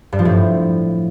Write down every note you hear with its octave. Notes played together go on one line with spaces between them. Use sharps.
G2
F3
A2